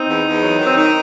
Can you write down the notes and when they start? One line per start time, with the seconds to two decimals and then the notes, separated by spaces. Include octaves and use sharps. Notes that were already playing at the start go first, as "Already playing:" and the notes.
Already playing: C4 D#4
0.09 E2
0.26 E2
0.43 F#3
0.59 D#3
0.66 C4
0.77 D#3 D#4